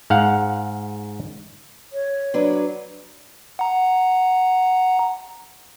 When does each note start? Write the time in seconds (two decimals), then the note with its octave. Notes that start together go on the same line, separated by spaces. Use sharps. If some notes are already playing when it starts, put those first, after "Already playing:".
0.10 G#2 F5 F#5
1.93 C#5
2.34 F#3 D4 B4
3.59 F#5 A#5